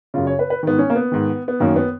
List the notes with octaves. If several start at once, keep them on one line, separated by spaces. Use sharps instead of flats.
F#2 C#3 F4
C#5
B4
B4
G#2 D#3 B3
C#4
A#3
B3
G#2 D#3
B3
F#2 D#3 A#3
B3